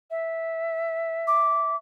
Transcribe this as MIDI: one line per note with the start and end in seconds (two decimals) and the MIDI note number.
0.11 1.75 76
1.27 1.77 86